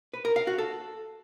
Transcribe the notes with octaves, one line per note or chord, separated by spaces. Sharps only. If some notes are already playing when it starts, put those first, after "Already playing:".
B4
A#4
F5
F#4
A4